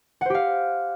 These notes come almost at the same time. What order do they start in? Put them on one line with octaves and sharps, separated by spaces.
F#5 C5 G4 F5